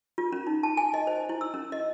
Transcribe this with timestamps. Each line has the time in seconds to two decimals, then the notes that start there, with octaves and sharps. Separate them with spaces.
0.18 F4
0.32 C#4
0.47 D#4
0.63 A5
0.77 G#5
0.94 D#5
1.07 C5
1.29 E4
1.41 E6
1.54 C#4
1.72 D#5